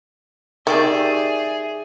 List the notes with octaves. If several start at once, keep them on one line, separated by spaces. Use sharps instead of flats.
D#3 G4 G#4 D5 E5